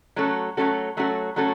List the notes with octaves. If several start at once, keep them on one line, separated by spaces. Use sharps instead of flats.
F#3 A3 C#4 F#4 A4
F#3 A3 C#4 F#4 A4
F#3 A3 C#4 F#4 A4
F#3 A3 C#4 F#4 A4